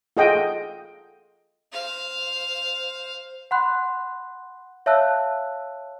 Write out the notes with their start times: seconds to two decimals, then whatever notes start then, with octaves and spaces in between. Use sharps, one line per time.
0.17 F4 G#4 A4 D#5 F#5 G5
1.72 C5 F5
3.51 F#5 B5 C6 F#6
4.86 C#5 E5 F5 A5 E6 F#6